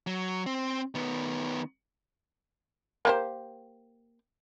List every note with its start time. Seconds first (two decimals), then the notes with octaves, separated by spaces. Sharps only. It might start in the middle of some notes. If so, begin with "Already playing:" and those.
0.07 F#3
0.46 C4
0.95 D#3 B3
3.05 A#3 G4 C5